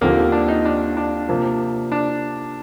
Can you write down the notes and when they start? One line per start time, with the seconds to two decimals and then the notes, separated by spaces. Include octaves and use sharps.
0.01 D#2 D3 F3 A#3 C4 G4
0.32 D4
0.48 D#4
0.65 D4
0.97 D4
1.28 C3 F3 A#3
1.92 D4